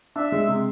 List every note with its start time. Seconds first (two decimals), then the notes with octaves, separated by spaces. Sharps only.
0.16 D4 E5
0.32 G#3
0.48 C3